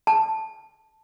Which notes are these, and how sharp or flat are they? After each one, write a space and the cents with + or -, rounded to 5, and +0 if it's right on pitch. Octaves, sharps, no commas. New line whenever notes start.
A5 +0